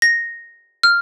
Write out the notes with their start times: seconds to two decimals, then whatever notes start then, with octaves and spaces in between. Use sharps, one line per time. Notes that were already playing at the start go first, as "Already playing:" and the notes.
0.02 A#6
0.83 F6